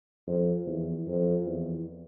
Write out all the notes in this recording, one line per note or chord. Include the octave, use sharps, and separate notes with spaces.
F2
E2
F2
E2